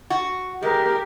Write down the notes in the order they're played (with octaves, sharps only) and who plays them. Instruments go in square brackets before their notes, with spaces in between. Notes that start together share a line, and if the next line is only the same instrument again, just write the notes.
[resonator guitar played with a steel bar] F#4
[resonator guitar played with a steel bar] G#3 [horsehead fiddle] G4 A#4